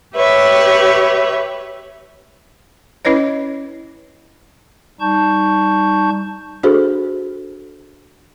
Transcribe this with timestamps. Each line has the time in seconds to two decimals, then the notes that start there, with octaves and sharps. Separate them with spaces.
0.15 G4 B4 C#5 E5
3.05 C#4 E4 B4 C#5 D#5
5.00 G3 D#4 A5 C#6 G6
6.63 D4 F#4 G#4 A4 C5